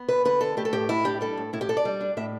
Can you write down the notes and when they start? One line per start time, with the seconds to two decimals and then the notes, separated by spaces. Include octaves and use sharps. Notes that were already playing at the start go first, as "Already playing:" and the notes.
Already playing: B3
0.08 D3 B4
0.25 D3 B4
0.41 D4 A4
0.57 A3 G4
0.65 A4
0.72 A2 G4
0.89 A2 E4
1.04 D4 G4
1.21 G3 A4
1.37 A2
1.53 A2 E4
1.61 G4
1.69 D4 A4
1.77 D5
1.85 G3
2.01 D4
2.17 A2 E5